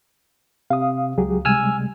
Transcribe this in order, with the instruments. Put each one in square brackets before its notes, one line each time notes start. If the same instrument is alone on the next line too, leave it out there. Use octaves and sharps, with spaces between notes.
[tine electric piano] C3 [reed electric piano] F5 D#6
[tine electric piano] C#2 [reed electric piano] F#3 G4 G#4
[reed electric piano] C3 G3 G#3 [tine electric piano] G#5 E6 F6